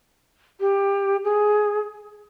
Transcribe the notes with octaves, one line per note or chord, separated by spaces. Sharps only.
G4
G#4